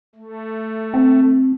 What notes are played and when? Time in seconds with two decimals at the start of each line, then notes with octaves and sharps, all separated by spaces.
0.15 A3
0.94 C4